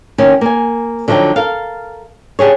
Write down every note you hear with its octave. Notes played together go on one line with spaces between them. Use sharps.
D#3 A#3 C#4
A#3 G#5
D3 F3 F#3 D#4 G5
A4 A#4 F5
D4 G4 G#4 C#5